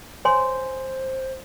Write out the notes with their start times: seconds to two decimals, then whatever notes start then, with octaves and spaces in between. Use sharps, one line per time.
0.25 C5 C#5 G#5 C6